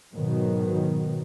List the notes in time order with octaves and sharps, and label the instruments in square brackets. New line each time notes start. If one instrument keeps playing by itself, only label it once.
[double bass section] G#2 B2 D#3 F#3